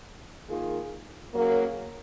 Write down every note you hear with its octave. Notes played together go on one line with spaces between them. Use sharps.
D#3 A#3 F4 G#4
C#3 F#3 A#3